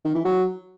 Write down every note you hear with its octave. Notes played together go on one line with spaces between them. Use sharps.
D#3
E3
F#3